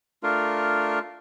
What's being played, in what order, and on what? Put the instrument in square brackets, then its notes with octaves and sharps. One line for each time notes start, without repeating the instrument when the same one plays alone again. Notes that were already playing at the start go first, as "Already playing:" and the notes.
[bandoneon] A3 D4 F4 A#4